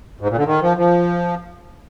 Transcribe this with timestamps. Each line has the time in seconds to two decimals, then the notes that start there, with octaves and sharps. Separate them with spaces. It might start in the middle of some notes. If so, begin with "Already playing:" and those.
0.21 G#2
0.29 A#2
0.37 D3
0.45 D#3
0.61 F3
0.77 F3